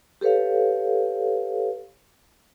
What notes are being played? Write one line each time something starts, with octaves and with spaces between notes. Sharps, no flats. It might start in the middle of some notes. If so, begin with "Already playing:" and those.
G4 A4 B4 C#5 F5